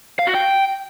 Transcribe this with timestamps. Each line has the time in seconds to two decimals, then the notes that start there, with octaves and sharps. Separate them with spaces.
0.19 F5
0.27 F#4
0.35 G5